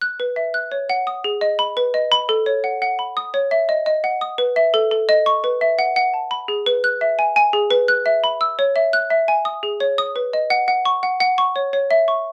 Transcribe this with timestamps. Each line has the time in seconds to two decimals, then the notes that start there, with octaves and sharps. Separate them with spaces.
0.01 F#6
0.20 B4
0.36 E5
0.54 F#6
0.72 C#5
0.90 F#5
1.07 D#6
1.24 G#4
1.41 D#5
1.59 B5
1.77 B4
1.94 D#5
2.12 B5
2.29 A4
2.46 C#5
2.64 F#5
2.82 F#5
2.99 B5
3.17 D#6
3.34 C#5
3.51 E5
3.69 D#5
3.86 D#5
4.04 F#5
4.21 D#6
4.38 B4
4.56 E5
4.74 A4
4.91 A4
5.09 D#5
5.26 C#6
5.44 B4
5.61 E5
5.79 F#5
5.96 F#5
6.14 A5
6.31 B5
6.48 G#4
6.66 B4
6.84 F#6
7.01 E5
7.19 G#5
7.36 G#5
7.53 G#4
7.71 B4
7.88 F#6
8.06 E5
8.24 B5
8.41 E6
8.59 C#5
8.76 E5
8.93 F#6
9.10 E5
9.28 G#5
9.45 D#6
9.63 G#4
9.80 C#5
9.98 D#6
10.16 B4
10.33 D#5
10.50 F#5
10.68 F#5
10.85 C#6
11.03 F#5
11.20 F#5
11.38 C#6
11.56 C#5
11.73 C#5
11.91 E5
12.08 C#6